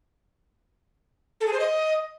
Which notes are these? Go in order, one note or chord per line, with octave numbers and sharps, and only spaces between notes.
A4
G#4
C5
D#5